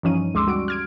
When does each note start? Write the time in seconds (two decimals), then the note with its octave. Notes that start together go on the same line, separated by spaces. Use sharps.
0.03 G2 E3 F3 C#4 D#4 D#7
0.34 D2 G#3 C6 D6 E6
0.47 G3 F#4 D7
0.68 F6 G#6 D7